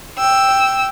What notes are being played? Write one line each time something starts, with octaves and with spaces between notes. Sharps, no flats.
G5 E6